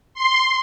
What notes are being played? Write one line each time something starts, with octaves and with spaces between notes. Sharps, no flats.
C6